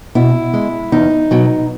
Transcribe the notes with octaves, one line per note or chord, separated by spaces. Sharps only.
B2 E4
G#3
E2 D#4
B2 F#3